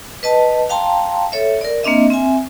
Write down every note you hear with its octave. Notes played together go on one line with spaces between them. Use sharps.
B4 D#5 A5
F5 G5 A5 A#5 C6
A4 C#5 E5
A#4 D5
A#3 C4 D4 D#5 E5
C4 E5 G#5